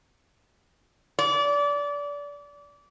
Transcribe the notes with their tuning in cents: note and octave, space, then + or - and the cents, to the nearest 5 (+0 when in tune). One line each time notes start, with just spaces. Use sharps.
D5 -25